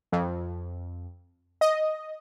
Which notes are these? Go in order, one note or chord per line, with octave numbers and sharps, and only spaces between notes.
F2
D#5